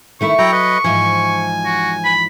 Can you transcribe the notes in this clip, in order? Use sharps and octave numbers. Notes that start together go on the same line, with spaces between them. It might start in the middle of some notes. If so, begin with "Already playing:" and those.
D#3 A3 E4 C#6
F#3 E4 G5 A#5
B4 D#5
G#2 E3 F3 G#5
F#4
B5